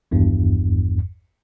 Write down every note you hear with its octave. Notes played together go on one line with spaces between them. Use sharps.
G#1 E2 G2